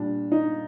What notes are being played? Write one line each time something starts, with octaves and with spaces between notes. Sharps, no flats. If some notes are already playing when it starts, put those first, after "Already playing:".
Already playing: A#2 G3 D4
D#4